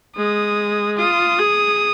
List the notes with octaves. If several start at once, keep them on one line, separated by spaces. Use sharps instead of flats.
G#3 D#6
F4 D#6
G#4